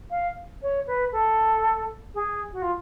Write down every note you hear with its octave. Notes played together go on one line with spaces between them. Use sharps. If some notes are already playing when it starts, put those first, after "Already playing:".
F5
C#5
B4
A4
G#4
F#4
F4